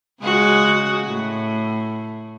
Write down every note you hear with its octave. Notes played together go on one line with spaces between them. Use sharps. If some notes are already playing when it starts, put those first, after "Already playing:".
C#3 G#3 F#4
A2